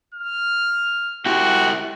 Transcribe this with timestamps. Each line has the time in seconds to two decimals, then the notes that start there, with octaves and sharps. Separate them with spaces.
0.14 F6
1.26 E4 F#4 G4